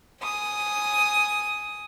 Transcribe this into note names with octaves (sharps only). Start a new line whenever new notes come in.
G#5 D#6